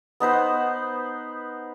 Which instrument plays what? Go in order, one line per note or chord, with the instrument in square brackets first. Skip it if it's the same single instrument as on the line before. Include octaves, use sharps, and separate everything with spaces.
[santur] B3 D#4 B4 C5